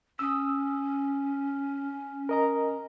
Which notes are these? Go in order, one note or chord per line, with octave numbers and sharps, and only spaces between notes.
C#4 D#6 E6
A#4 D#5 A#5